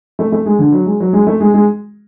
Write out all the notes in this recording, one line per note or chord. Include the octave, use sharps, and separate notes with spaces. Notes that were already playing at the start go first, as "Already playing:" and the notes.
A3
A3
G#3
D3
F#3
G#3
F#3
G#3
A3
G#3
G#3